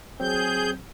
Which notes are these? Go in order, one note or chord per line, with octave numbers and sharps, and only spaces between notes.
F#3 C4 G#4 G6